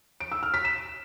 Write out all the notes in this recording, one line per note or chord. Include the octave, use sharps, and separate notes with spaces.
D7
E6
F6
B6
E7